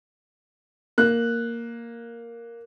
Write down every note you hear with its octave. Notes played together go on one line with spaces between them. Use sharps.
A#3 F#6